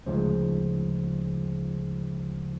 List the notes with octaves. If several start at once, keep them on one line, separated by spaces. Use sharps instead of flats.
D2 C#3 F3 G#3 C5